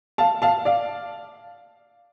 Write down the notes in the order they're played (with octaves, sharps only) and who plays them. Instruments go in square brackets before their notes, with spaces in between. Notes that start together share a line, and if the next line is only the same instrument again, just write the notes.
[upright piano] F5 A5
F5 A5
D5 F5